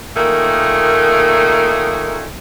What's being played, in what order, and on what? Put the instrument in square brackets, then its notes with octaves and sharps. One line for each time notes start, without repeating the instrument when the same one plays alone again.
[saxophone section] A#2 D#3 A3 A#3 G#4